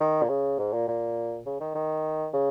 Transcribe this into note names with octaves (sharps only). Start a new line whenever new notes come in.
D#3
A#2
C#3
G#2
A#2
A#2
C#3
D#3
D#3
C#3